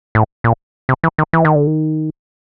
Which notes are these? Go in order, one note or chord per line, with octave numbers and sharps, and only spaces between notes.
A2
A#2
C3
E3
D#3
E3
D#3
D3
D#3